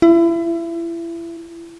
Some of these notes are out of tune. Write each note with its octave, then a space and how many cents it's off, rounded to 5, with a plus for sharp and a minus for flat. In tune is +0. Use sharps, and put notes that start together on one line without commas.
E4 +30